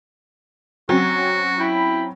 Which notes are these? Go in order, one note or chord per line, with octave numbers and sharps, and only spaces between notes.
F#3 C4 C#4 F#4
E4 G5 B5